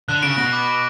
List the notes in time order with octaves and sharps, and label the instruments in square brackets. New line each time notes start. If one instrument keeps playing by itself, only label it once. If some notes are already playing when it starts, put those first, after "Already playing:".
[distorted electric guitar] D3 [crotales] F#6
[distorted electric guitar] C#3 [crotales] D7
[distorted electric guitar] B2 [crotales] A#6
[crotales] D6
D6